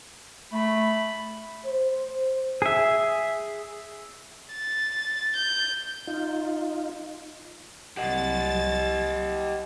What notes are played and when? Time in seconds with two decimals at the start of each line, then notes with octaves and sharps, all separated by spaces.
0.53 A3 B5
1.65 C5
2.62 G#4 E5
4.53 A6
5.36 G6
6.07 D#4 F4
7.97 C2 F#3 G4 D#5 F#5 A6